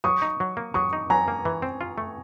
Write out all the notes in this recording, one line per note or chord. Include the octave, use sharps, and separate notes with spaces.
F#3 C#6 D#6
D#4
F#3
A#3
F#3 C#6 D#6
D#4
F#3 G#5 A#5
A#3
E3
C4
F4
A3